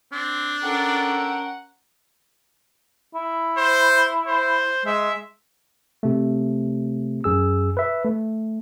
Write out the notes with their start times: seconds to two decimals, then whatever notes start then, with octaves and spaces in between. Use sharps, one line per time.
0.13 C4 D4
0.64 C#4 A4 A#4 F#5 G5
3.15 E4
3.57 C5
4.28 C5
4.86 G#3 E5
6.03 C3 A3
7.24 F#2 G#4 E6
7.77 B4 E5
8.05 A3